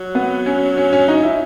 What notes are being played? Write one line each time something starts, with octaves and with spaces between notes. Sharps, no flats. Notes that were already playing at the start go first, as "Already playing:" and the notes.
Already playing: F#3
B3
C#4
C#4
C#4
D#4
E4